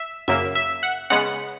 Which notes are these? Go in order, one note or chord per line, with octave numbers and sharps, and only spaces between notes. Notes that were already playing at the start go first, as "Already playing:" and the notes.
Already playing: E5
F#2 C#3 F#3 A#3 E5
E5
F#5
C#3 G#3 B3 F#5